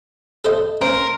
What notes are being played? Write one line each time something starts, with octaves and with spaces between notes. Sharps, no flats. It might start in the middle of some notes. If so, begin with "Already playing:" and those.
A4 C5 D#5
C#4 A#4 C5